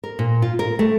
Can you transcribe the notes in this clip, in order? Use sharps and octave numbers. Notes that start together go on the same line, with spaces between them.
A#4
A#2
F4
A#4
A3